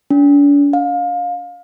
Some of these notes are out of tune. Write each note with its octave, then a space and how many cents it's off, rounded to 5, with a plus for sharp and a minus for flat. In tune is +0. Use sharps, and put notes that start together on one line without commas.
D4 -45
F5 +25